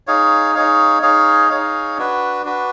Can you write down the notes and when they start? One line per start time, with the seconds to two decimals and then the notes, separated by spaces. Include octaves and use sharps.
0.07 D#4 G#4 C#5 F5
0.55 D#4 G#4 C#5 F5
1.02 D#4 G#4 C#5 F5
1.50 D#4 G#4 C#5 F5
1.98 D4 F#4 B4
2.45 D4 F#4 B4